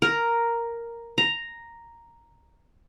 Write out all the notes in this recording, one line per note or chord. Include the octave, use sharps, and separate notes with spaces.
A#4
A#5